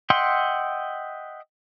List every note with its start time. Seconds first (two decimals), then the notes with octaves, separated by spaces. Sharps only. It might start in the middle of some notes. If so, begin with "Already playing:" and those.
0.10 D#5 E5 F#5 G5 C6